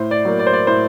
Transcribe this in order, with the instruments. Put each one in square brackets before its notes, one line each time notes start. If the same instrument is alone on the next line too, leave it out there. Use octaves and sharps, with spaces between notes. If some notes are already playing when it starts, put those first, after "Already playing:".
Already playing: [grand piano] A2 C5
D5
F#3 A#3
D5
C5
D5
A2 C5